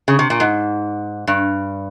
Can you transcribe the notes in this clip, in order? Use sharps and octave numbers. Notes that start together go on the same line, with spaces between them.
C#3
C3
A#2
G#2
G2